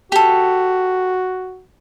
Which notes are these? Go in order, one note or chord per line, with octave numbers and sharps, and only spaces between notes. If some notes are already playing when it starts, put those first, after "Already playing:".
F#4 G4 A4